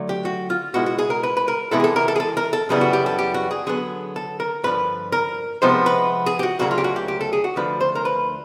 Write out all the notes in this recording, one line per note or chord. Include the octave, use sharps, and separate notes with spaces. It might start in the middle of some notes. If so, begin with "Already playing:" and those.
Already playing: D3 F#3 A3
G4
F#4
F4
B2 G#3 B3 E4 F#4
F#4
G#4
A#4
B4
B4
A#4
C3 E3 G#3 B3 E4 A4
G#4
A4
A#4
A4
G#4
A4
A#4
A4
F#2 C#3 E3 G3 B3 G#4
F#4
G4
A4
G4
F#4
G#4
D3 F#3 B3 G#4
A4
A#4
G2 D3 F3 B4
A#4
C3 F3 G#3 B3 D#4 C5
B4
G#4
G4
F#4
D2 C#3 F#3 A#3 F#4
F4
G4
F#4
G4
G4
A4
G#4
F#4
D2 D3 F3 B4
C5
A#4
B4